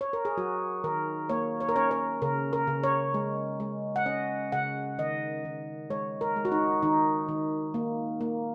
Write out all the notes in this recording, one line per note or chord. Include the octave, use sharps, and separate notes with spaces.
C#5
A#4
G#4
F#3 F#4
D#3 A#4
A#3 C#5
C#5
A#4
C#4 C#5
C#5
C#3 A#4
A#4
C#3
C#5
G#3
G#3
F#5
C#4 D#5
C#3 F#5
D#3 D#5
D#3
G#3 C#5
A#4
G#3
F#4
D#4
D#3 D#4
D#3
A#3
A#3